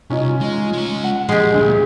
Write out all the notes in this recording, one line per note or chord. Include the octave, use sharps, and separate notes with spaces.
C2 C#4 D#4 F4
G#3
G#3 C#5
F#5
A#2 F3 G#3 G4
D2 G2